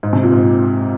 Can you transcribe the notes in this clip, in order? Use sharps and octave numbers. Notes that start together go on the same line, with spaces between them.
G#2
C3
A#2
G#2